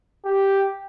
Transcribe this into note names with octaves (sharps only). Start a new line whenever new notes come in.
G4